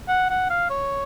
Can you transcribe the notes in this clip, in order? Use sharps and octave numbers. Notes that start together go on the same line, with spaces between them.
F#5
F#5
F5
C#5